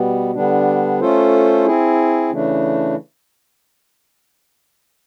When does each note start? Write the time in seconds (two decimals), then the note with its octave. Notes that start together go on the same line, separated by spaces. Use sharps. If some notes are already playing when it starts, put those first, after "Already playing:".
Already playing: B2 G3 B3
0.35 D3 G3 B3 D4
1.01 A3 C#4 F4 A4 C5
1.65 C4 E4 G#4
2.30 C#3 E3 A3 D4